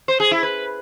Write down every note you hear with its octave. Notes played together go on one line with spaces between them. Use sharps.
C5
G#4
E4
B4